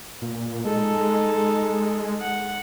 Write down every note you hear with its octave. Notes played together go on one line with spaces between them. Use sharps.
A#2
G#3 D#4 A4
G#3
F#5